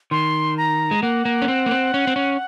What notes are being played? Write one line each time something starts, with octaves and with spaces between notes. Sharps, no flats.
D#3 C6
A#5
G#3
A#3 F#5
A#3
C#4
C4
A#3
C4
C#4
C4
C#4